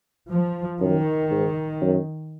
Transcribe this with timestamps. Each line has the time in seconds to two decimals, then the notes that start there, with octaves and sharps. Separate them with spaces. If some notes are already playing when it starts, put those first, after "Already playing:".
0.30 F3
0.80 F#2 D#3
1.31 G#2
1.81 F#2